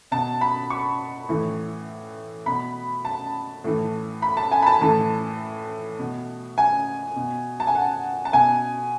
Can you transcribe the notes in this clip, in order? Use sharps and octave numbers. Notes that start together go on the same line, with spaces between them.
B2 A5
B5
C#6
A2 E3
B2 B5
A5
A2 E3
B5
A5
G#5
B5
A5
A2 E3 A5
B2
G#5
B2
A5
G#5
F#5
A5
B2 G#5